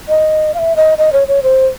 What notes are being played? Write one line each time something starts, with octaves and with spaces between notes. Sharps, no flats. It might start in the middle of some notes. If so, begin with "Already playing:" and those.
D#5
F5
E5
D#5
D#5
C#5
C#5
C5